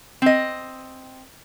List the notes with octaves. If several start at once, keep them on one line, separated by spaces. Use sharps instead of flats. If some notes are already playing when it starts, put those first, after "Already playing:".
C4 D#5